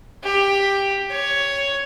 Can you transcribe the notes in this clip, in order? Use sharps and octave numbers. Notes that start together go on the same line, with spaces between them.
G4
C#5